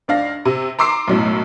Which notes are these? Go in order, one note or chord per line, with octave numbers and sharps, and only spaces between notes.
C#2 D4 F5 A#6
C3
A#5 C6 D6 E6 C7
B1 F#2 A2